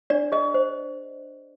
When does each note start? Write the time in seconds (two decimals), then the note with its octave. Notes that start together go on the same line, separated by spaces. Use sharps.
0.10 D4 D5
0.32 G#4 D#5
0.54 C5